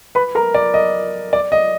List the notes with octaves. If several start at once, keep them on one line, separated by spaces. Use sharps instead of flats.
B4 B5
A#4 A#5
D5
D#5
D5
D#5